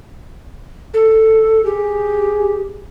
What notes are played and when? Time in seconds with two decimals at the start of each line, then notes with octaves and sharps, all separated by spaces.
0.94 A4
1.65 G4 G#4